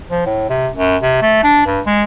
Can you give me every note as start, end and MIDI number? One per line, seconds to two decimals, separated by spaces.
0.10 0.24 53
0.26 0.46 45
0.49 0.68 48
0.74 0.97 42
1.02 1.17 48
1.22 1.41 57
1.44 1.64 62
1.66 1.81 43
1.87 2.03 56